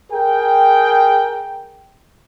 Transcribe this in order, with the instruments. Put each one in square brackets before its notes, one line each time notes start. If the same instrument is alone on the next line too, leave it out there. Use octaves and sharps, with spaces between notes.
[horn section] G#4 A#4 G5